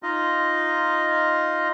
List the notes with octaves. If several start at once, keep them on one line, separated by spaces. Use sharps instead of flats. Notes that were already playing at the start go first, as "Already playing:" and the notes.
D#4 F4 D#5